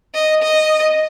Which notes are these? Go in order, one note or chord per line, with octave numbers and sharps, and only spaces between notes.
D#5
D#5